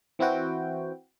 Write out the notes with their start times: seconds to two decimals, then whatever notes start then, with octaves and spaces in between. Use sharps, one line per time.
0.19 E3 C4 E4 F#4 G5